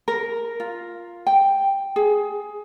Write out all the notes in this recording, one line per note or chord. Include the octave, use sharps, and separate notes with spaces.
A#4
F4
G5
G#4